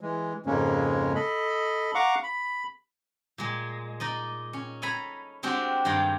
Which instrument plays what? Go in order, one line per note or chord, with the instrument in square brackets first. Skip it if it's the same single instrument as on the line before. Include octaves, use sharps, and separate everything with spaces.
[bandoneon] E3 G#3
F2 G#2 C#3 G#3 A#3 C#4
A4 D#5 B5
F5 F#5 A#5 C#6 D6
B5
[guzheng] A#2 G#3
D#4 D5 D#5
C#4
A4 D#5 G#5 A#5 B5
G#3 C4 D4 F#4 G4
G2 D#3 G#3 D5 F5 G5